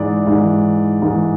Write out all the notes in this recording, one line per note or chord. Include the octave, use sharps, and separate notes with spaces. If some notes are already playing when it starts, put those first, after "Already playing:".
Already playing: G#2 E3 D5
G#2 E3
G#2 E3